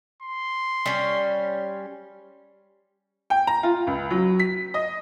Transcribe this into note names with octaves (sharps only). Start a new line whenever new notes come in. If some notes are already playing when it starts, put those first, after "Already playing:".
C6
G3 C#4
G5
A#5
F4
C#2
F#3
B6
D#5